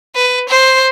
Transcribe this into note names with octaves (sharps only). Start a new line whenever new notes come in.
B4
C5